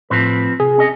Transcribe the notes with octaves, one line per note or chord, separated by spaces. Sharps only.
A2 F3 C4 B4
C3 G#4
C#4 D#5